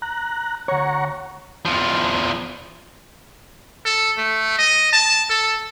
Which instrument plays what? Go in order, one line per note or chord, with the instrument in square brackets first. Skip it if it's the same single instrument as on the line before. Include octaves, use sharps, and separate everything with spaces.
[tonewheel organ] A#5 F#6
[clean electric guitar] D2 C#5 [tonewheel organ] F#5 A#5 C#6
[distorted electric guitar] E2 F3
[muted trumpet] A4
A3
D#5
A5
A4